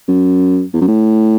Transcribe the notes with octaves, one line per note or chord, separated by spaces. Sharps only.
F#2
E2
F#2
A2